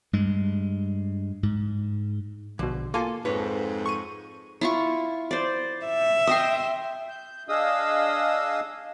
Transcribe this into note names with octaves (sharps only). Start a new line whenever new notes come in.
G2 G#3
G#2
A#1 B2 D3
A#3 F4 A4 G#5
F2 G#2 B4 C#5
C#6 D#7
E4 F4 C#6
C5 D5
E5
D#5 G5 C6
G6
D4 G#4 D#5 F5 D#6 E6